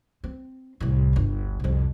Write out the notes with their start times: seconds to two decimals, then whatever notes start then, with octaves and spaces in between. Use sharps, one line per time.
0.24 C4
0.80 C2 A2
1.13 G1 D2
1.60 C2 F2